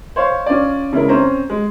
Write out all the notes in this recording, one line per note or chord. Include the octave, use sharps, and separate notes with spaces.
C5 C#5 F5
C#4 F4 D5
C#3 G#3 E4 A#4
C4 C#4 C5 A#5
G#3